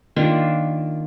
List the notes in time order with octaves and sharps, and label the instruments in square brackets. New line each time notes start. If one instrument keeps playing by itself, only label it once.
[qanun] D#3 A#3 D4 F4